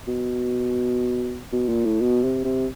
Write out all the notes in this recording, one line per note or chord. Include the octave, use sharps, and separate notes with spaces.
B2
B2
A#2
A2
B2
C3
C3